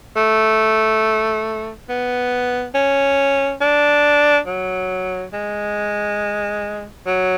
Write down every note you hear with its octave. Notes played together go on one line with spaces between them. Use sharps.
A3
B3
C#4
D4
F#3
G#3
F#3